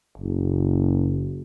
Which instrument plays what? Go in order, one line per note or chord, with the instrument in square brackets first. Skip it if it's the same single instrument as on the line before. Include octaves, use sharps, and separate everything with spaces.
[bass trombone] F#1